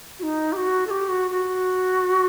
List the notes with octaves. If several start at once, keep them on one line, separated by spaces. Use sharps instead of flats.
F#4
D#4
G4
F#4
A4
G4
F#4
F#4